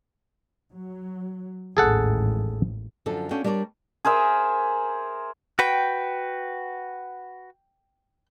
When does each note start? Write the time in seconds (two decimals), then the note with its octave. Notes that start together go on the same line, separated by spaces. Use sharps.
0.71 F#3
1.77 A1 D#2 G#2 G#4 A4 F#5
3.06 F#2 D3 F3 A4
3.31 C#4 D4 F#4 A4 F5 G5
3.44 G3 D4 A#4 C#5 D5
4.05 G#4 A#4 C5 E5
5.59 F#4 B4 G5